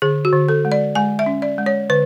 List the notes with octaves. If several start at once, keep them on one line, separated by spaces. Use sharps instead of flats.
D3 G#4
F#4
D3
A4
G#3
D5
G#3 G#5
E5
C#4
D5
G#3
C#5
D3 B4